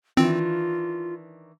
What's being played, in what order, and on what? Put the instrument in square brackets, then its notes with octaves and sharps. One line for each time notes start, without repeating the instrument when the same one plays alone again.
[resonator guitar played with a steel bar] D#3 E3 D4 [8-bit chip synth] C4 [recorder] F4